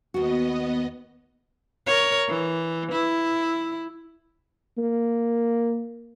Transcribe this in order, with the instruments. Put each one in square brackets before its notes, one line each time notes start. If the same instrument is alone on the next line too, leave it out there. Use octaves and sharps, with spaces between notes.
[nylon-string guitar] D#2 F#4 [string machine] B3 D#5
[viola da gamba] A#4 C#5
E3
E4
[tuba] A#3